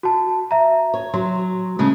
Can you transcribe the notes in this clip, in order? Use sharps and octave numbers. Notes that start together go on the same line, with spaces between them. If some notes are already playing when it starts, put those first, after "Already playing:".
F#4 A5
E5 A#5
C#5
F#3 C6
C#3 G#3 A3